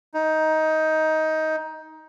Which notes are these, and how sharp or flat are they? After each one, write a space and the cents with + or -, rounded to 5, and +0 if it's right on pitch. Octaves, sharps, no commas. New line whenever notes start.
D#4 +15